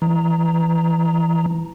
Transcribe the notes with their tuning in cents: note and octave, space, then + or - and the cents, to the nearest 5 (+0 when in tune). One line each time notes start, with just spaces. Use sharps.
E3 +15 A#5 +0